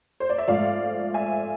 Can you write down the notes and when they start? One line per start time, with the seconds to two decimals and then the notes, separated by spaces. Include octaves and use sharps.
0.20 C5
0.29 D5
0.38 E5
0.48 G#2 F3 A3 D5 F5
1.14 E5 G#5